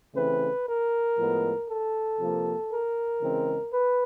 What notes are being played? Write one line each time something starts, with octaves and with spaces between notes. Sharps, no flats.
C#3 E3 A3 C4 B4
A#4
A2 F3 G#3 B3
A4
C3 F3 A#3
A#4
C#3 E3 G#3 C4
B4